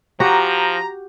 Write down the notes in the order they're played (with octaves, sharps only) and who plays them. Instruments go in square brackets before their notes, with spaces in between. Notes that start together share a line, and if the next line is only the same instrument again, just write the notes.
[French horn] F3 [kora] F#4 G4 [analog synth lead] A#5